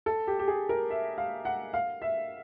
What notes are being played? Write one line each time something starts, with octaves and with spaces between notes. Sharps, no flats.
A4
G4
G4
G#4
A#4
E5
F5
F#5
F5
E5